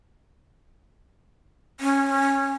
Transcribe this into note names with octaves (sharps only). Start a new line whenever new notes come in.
C#4